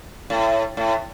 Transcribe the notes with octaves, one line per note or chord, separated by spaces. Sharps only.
A2
A2